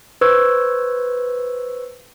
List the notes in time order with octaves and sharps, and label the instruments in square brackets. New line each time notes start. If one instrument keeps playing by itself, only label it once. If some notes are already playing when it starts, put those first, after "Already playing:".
[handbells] B4 C5 C#6 E6 G#6